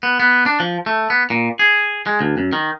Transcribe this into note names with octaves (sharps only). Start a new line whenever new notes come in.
B3
B3
D4
F3
A3
B3
A#2
G#4
G#3
D2
F#2
D#3